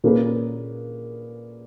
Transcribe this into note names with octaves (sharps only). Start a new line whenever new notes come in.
A#2 A#3 C#4 G#4 B4